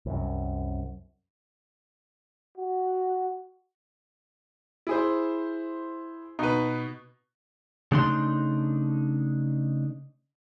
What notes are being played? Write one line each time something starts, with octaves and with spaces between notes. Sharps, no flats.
C2 F#2
F#4
E4 G#4 C5
B2 D#4 B4
C#3 A3 D4 D#4 C6